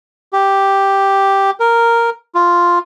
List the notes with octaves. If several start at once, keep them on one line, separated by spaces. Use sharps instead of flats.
G4
A#4
F4